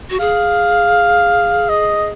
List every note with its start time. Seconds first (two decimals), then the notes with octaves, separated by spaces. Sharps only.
0.10 F#4
0.20 G#4 F5
1.69 D#5